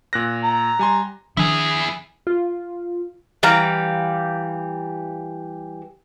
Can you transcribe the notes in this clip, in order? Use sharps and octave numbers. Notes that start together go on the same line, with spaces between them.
A#2 F#6 A#6
A#5
G3 G#5 C6
D#3 F3 D4 E4 G#4
F4
E3 G3 F5 A#5